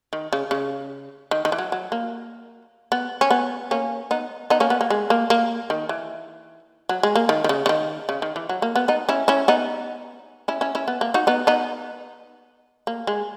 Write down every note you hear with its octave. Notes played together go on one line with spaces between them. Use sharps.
D#3
C#3
C#3
D#3
D#3
E3
F#3
F#3
A#3
B3
C#4
B3
A#3 C#4
B3 D#4
B3 D#4
A#3 C#4
B3
A#3
G#3
A#3
A#3
D#3
E3
F#3
G#3
A#3
D#3
D#3
C#3
C#3
D#3
C#3
D#3
E3
F#3
A#3
B3
B3 D#4
C#4 E4
C#4 E4
B3 D#4
C#4 E4
C#4 E4
C#4 E4
B3
A#3
D#4 F#4
B3 D#4
B3 D#4
A#3
G#3